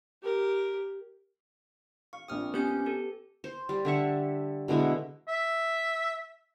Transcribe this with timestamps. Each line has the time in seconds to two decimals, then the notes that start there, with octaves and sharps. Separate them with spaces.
0.23 G4 A#4
2.13 F5 C#6
2.28 A#1 C4 D#6 F6
2.54 B3 C#4 G4 G6
2.86 G4 A4
3.44 C5
3.69 G3
3.85 D3 E5 C#6
4.68 B2 D3 G#3 E4
5.28 E5